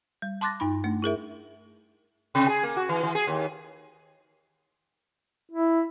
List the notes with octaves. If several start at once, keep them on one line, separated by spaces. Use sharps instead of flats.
G3
A5 C6 D6 F#6 A6 A#6
G2 D#4 B5
A3 D4
E4 G#4 A#4 E5
C3
G#4
A#3
F#4
E3
E3
G#4
D#2
E4